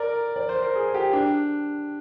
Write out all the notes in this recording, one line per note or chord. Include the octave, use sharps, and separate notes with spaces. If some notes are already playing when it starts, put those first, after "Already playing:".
Already playing: A#4 D5
D5
C5
A#4
G#4
G4
D4